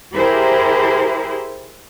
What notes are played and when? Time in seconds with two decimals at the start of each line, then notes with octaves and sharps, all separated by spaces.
0.15 E4 G4 G#4 A#4 C5